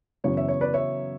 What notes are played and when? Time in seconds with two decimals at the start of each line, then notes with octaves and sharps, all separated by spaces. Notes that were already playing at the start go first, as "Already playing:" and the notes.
0.24 F#2 C#3 E3 B3 C#5
0.37 C#5 E5
0.48 C#5
0.61 B4 D5
0.74 C#5 E5